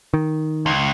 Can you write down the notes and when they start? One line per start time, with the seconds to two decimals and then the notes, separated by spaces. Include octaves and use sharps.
0.14 D#3
0.66 C#2